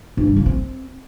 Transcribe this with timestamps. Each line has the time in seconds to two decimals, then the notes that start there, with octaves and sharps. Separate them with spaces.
0.17 G2
0.27 G3
0.36 C#3
0.46 C4